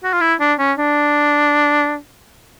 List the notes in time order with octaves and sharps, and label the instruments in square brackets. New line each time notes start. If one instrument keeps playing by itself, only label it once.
[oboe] F#4
F4
E4
D4
C#4
D4